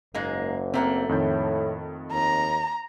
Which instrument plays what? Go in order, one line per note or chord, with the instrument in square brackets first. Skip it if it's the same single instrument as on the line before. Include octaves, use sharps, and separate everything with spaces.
[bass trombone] F#1 [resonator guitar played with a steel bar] G#2 G#3 A#3
[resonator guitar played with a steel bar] A3 A#3 F#5 [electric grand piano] C4
[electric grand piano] F2 D#3 G6 [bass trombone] A2
[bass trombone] D#2 [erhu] A#5